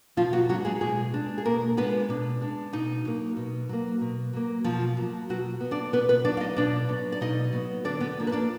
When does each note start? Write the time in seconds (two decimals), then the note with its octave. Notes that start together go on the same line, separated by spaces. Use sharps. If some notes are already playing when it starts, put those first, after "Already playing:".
0.17 B2 F3 F4
0.33 F#3 F#4
0.49 F#3 G#3 D4 F#4
0.65 G#3 G#4
0.81 B2 G#3 G#4
1.14 G#3 D4
1.38 G#4
1.45 B2 A#3 A#4
1.77 G#3 B3 D4 B4
2.09 B2 D4
2.41 G#3 D4
2.73 B2 D#4
3.05 F#3 A#3
3.37 B2
3.69 F#3 A#3
4.01 B2
4.33 F#3 A#3
4.64 B2 F3 F4
4.97 F#3 A#3
5.29 B2 F#3 F#4
5.61 F#3 B3
5.71 D4 D5
5.93 B2 B3 B4
6.09 B3 B4
6.25 F#3 D4 D5
6.29 B3
6.37 F5
6.40 D#4 D#5
6.56 B2 D4 D5
6.89 F#3 B3
7.12 D5
7.21 B2 D#4 D#5
7.52 F#3 B3
7.84 D3 D4 D5
8.00 B3 B4
8.18 F3 A#3 D4
8.27 B4
8.32 D4 D5